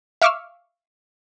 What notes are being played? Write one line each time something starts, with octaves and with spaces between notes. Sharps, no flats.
E5 F5 C#6 D6 E6 F6